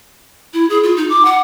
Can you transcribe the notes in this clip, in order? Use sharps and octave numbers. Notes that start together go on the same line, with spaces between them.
E4
G#4
F4
D#4
D6
F#5